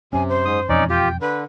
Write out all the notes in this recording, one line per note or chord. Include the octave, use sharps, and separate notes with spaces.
F#2 C3 C#4 G#5
C5
G#2 D#6
E1 F2 C#4 D#4 D5
F4 G4 G5
D3 B4